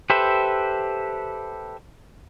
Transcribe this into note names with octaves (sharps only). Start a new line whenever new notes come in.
G4 A4 B4 C5 E5